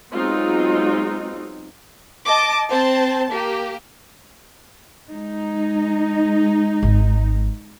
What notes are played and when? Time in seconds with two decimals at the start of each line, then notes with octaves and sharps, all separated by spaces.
0.12 F#3 G#3 B3 C4 D#4 F4
2.26 D#5 A5 D6
2.69 C4 C5 A5
3.28 A#3 G4
5.10 G#3 D#4
6.83 G#1